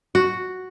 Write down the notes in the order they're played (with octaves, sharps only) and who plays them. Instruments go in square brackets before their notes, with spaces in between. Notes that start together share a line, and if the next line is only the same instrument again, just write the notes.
[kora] F#4